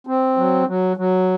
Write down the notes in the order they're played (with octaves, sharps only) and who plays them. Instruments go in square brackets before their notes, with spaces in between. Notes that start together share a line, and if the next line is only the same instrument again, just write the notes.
[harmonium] C4
F#3
F#3
F#3